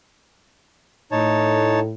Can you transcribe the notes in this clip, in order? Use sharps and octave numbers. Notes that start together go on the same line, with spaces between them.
A2 D#4 C#5 A5